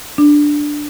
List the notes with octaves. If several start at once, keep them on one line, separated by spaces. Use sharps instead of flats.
D4